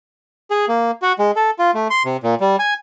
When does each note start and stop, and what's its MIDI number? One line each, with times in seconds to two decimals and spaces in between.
0.50 0.65 68
0.68 0.91 58
1.02 1.13 66
1.19 1.31 56
1.36 1.51 69
1.59 1.71 65
1.74 1.88 57
1.90 2.03 84
2.05 2.17 48
2.24 2.35 46
2.40 2.56 55
2.59 2.74 80